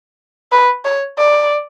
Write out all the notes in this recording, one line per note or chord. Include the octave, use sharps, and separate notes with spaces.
B4
C#5
D5